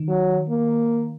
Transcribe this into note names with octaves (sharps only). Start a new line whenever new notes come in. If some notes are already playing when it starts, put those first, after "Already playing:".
Already playing: D#3
F#3
A#3